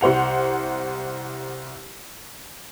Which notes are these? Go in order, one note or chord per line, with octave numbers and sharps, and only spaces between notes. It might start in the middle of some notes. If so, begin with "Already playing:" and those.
C2 C5 F#5 F7